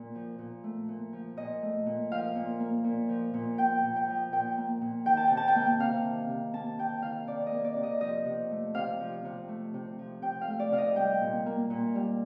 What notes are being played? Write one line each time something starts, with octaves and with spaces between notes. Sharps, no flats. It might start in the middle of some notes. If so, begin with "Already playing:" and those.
Already playing: A#2
F3
A#2
A3
A#2
F3
A#2 D#5
A3
A#2
F3 F5
A#2
A#3
A#2
F3
A#2
A#3 G5
A#2
G5
F3
A#2 G5
A#3
A#2
D#3 G5
A5
C3 G5
A5
G5
A#3
C3 F5
D#3
C3
A#3 A5
C3 G5
D#3 F5
C3 D5
D#5
A#3
D5
C3
D#5
F3 D#5
C3
A3
C3 F5
F3
C3
A3
C3
F3
C3 G5
F5
A3
D5
C3 F5
D#5
G3 G5
A#2
A#3
A#2
G3